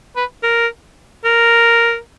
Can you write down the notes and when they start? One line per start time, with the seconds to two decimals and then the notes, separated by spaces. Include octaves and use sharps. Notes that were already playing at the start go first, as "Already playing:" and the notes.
0.16 B4
0.43 A#4
1.24 A#4